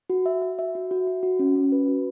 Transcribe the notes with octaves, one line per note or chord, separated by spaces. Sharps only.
F#4
E5
E5
E5
F#4
F#4
F#4
F#4
C#4
C#4
B4
F#4